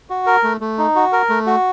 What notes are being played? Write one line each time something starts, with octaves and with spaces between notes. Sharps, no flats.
F#4
A#4
A3
A3
D#4
F#4
A#4
A3
F#4